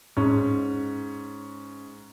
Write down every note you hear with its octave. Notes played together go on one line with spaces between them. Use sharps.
G#2 C#4